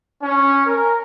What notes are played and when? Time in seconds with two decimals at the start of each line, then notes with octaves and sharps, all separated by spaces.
0.23 C#4
0.66 A#4